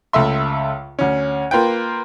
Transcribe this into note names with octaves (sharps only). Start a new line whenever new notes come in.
C#2 A3 E5 C6
D2 C#4
A#3 F4 B4 G5